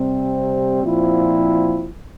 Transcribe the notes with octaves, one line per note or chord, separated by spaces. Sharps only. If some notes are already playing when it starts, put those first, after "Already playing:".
Already playing: C3 G3 C4
A#2 F3 C4 E4